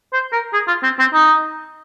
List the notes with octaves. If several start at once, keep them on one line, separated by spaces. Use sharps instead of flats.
C5
A#4
G#4
F4
C4
C4
D#4